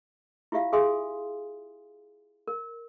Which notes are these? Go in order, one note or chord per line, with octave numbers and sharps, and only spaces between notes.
E4 F4 G4 E5 F5
G#4 E5 F5 G#5 C6 D#6
A#4